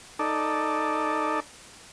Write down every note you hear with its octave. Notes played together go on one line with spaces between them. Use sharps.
D#4 A4 D5